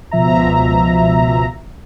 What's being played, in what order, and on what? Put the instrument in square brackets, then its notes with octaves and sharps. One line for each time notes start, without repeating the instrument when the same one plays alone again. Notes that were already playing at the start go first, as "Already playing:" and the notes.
[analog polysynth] C#2 B2 F3 E5 A#5